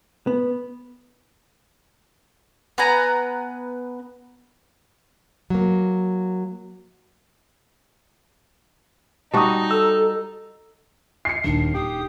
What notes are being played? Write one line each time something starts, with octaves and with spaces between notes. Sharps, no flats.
B3
B3 B4 G#5 A#5
F#3 A#3
G3 D#4 F#4 A5 D#6
A4 E6
C7 C#7
D#1 D#2 D4 D#4
G4 D#6